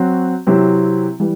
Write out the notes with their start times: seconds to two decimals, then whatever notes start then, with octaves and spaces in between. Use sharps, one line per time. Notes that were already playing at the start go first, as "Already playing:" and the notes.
Already playing: F#3 C4 F#4
0.47 C3 F#3 C4 E4 G4
1.20 E3 G3